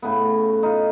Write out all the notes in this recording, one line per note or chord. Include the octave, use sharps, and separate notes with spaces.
A2 C#3 B3
D#4 F4